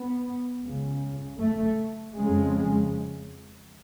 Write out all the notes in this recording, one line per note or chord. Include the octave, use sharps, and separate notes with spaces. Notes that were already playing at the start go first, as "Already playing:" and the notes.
Already playing: B3
C#2 C#3
A3
F2 C#3 G#3